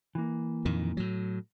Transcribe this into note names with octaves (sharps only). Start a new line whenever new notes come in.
E3 A#3
F2 A#2 D#3
A2 F#3